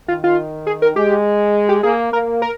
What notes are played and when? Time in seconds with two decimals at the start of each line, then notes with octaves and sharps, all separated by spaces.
0.08 D#3 F4
0.24 F4
0.67 G#4
0.82 A#4
0.96 G#3 G4
1.69 G4
1.83 A#3 G#4
2.13 A#3 A#4
2.42 A#4